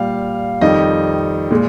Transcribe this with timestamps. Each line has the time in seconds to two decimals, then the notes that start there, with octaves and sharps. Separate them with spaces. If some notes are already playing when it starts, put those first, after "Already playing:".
Already playing: A#2 G3 F5
0.61 F2 D#3 G3 D#5
1.51 A#2 G#3